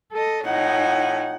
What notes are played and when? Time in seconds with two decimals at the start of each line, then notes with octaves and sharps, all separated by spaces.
0.12 A4 D#5
0.45 A2 D#4 F4 F#5 G#5